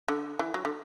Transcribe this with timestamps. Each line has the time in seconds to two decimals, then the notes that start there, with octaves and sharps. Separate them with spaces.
0.08 D3
0.39 E3
0.54 F#3
0.65 D3